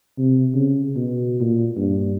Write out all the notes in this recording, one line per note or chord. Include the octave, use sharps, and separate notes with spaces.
C3
C#3
B2
A#2
G2